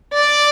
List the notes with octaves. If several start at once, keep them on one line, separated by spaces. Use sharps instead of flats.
D5